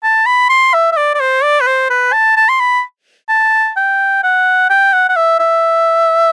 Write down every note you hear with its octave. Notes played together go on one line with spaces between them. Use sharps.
A5
B5
C6
E5
E5
D5
D5
C5
D5
B4
C5
B4
A5
A5
C6
B5
A5
G5
F#5
G5
F#5
F#5
E5
E5